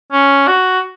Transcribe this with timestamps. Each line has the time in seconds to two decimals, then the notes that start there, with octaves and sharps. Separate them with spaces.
0.12 C#4
0.48 F#4